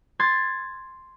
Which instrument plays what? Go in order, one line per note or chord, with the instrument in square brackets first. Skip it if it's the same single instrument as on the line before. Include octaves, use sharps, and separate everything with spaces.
[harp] C6 G#6 A6